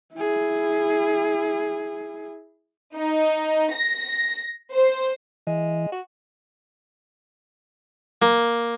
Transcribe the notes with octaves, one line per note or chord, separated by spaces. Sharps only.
E4 G#4
D#4
A#6
C5
E3 G#3
F#4
A#3